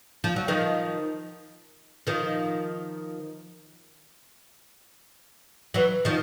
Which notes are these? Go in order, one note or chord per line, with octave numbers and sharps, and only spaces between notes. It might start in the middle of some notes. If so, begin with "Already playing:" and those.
F3
F#3
D#3 F3
D#3 F3
E3 F#3
D#3 F3